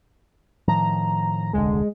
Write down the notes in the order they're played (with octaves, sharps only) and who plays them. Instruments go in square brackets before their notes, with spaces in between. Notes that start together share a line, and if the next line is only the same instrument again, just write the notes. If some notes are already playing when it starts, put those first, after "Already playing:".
[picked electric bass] A2 D#3 F3 [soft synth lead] A#5
[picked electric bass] D#1 C2 D3 [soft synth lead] G#3